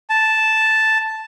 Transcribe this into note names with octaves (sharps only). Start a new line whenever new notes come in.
A5